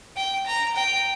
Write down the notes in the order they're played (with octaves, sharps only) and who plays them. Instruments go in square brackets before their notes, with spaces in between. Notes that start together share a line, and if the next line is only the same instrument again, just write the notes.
[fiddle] G5
A#5
G5